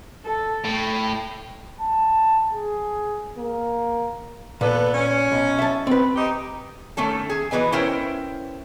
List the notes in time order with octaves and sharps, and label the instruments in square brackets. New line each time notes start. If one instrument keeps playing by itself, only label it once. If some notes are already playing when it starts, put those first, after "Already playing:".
[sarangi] A4
[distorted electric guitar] A2 [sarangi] G5
[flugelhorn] A5
G#4
A#3
[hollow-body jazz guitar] A#2 [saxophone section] B3 A4 B4
[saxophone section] C#4
[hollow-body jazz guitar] B1
E5 A5
C4 B4
[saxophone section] D#4 G4
[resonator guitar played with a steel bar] D#3 A3 C#4 A4
G#4
B2 E3 B4 D#5 G#5
C#4 E4 A#4 C5 G5